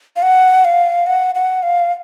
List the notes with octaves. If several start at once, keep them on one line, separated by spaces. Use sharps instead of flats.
F5
F#5
F5
F#5
F#5
F5